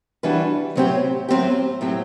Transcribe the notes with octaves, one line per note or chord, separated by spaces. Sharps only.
E3 G3 D4 F#4 B4
A2 F#3 C4 G4
A2 F#3 C4 G4
A2 F#3 C4 G4